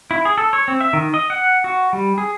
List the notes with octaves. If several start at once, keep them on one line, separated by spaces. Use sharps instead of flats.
E4
G#4
A4
C#5
C4
E5
D#3
D#5
F#5
F#4
G3
G#4